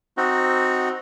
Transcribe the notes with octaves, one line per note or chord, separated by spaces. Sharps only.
C4 D#4 F#4